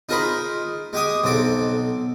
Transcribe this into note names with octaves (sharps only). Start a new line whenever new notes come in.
D#4 F4 G#4 A#4 C5 B5
G#3 G4 G#5 D#6
B1 C4 A4 D6